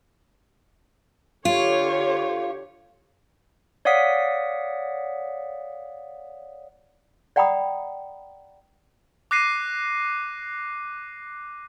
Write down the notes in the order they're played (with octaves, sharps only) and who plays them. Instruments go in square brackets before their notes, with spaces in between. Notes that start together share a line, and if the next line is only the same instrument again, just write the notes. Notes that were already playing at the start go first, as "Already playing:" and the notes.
[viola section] D3 G4 C#5 [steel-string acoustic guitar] F4
[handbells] C#5 D5 F5 F#5 D#6 B6
[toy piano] D5 F#5 G5 A#5 B5 D#6
[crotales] D6 F#6 A#6 C7 D#7